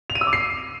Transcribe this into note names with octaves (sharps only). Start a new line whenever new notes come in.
F7
D#7
E6
D6
C7